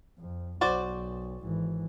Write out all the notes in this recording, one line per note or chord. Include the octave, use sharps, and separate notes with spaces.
F2
B1 F#4 C5 D5
G#1 E3